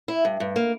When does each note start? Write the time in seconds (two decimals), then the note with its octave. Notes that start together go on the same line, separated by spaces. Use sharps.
0.08 E4
0.25 G2
0.40 G2
0.56 A#3